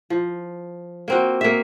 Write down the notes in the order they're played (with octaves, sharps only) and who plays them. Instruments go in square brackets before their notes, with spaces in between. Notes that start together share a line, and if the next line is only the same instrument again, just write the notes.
[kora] F3
A#3 C4 F#4
A#3 E5